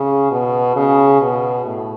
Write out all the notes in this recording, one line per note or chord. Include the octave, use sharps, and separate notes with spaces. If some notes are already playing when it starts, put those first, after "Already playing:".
Already playing: C#3
B2
C#3
B2
A2